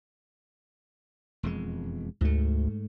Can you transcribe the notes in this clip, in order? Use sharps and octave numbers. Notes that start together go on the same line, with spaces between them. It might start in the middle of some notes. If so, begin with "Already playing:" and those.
E1 F2 G#3
D2 G#2 A3